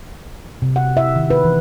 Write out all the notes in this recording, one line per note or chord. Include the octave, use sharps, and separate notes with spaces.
C3
F#5
E5
D#3
B4
E3